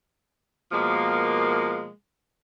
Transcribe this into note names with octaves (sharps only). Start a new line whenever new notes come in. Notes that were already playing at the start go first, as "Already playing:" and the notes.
B2 F3 G#3 A#3